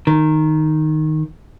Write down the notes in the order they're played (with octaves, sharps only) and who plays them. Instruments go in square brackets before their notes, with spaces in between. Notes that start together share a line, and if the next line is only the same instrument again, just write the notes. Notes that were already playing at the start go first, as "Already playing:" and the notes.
[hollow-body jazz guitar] D#3